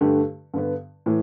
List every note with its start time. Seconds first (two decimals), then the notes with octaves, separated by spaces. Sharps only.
0.01 G2 D3 A3 G4
0.54 G2 D3 B3
1.06 A2 E3